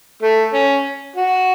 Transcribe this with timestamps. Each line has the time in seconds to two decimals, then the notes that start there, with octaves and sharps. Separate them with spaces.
0.22 A3
0.54 C#4
1.16 F#4